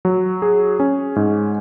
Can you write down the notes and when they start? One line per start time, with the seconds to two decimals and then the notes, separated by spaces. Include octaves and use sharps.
0.05 F#3
0.42 G#4
0.80 C#4
1.16 G#2